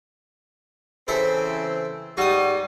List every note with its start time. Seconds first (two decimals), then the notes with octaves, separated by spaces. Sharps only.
1.08 C#3 E3 C4 A4 C5 E5
2.17 G#2 G3 F#4 D#6